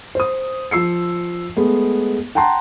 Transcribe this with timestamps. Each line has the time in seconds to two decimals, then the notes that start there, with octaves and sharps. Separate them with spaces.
0.15 C5 D#6
0.71 F3 E6 C7 C#7
1.57 G#3 A3 B3
2.35 F#5 G5 A5 A#5 C6